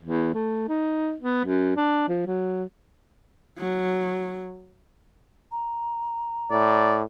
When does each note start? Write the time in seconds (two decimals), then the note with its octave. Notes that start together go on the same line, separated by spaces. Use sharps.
0.03 E2
0.34 A3
0.68 D#4
1.20 B3
1.45 F#2
1.76 D4
2.08 F3
2.26 F#3
3.58 F#3
5.52 A#5
6.51 A2 D5